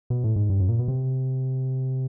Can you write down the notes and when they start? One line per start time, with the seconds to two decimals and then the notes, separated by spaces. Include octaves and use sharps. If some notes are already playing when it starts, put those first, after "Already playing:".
0.10 B2
0.24 A2
0.36 G#2
0.50 G2
0.60 F#2
0.68 A#2
0.79 B2
0.88 C3